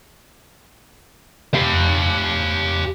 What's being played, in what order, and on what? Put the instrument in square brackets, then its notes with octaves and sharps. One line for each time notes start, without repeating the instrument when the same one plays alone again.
[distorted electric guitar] G4 F5